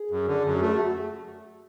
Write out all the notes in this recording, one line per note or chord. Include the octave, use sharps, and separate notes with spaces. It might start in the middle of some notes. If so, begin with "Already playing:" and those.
Already playing: G#4
F#2
D3
F#2
F#4
A3 G#4
F#4